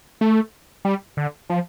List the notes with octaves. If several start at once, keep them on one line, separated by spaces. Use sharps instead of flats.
A3
G3
D3
F3